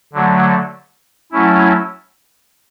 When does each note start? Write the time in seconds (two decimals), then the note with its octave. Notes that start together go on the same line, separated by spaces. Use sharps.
0.13 D3 F#3 A3
1.32 F#3 A3 C#4 E4